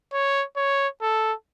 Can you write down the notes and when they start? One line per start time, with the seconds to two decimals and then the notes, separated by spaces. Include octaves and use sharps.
0.13 C#5
0.56 C#5
1.01 A4